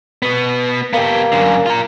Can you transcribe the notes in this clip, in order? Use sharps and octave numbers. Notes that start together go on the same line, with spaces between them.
B2 B3
A#3 B3 G4
F#2 D3
F4 A#5